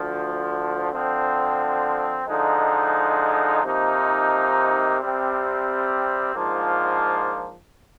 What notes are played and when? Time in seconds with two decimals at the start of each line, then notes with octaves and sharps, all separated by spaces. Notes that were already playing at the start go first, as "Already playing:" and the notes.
Already playing: D2 D3 F3
0.92 D3 F3 C4
2.27 D3 F3 G#3 D#4
3.63 C3 F3 A#3 D#4
4.99 C3 G3 C4
6.35 G#2 F3 A#3 D4 F4